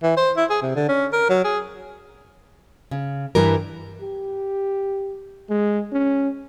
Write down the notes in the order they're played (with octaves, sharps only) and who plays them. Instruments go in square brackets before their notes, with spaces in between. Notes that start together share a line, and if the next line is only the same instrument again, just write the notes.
[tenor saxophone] E3
C5
E4
G#4
C3
D3
C#4
A#4
F#3
G#4
[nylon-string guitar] C#3
G2 E3 G3 A#4
[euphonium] G4
G#3
C#4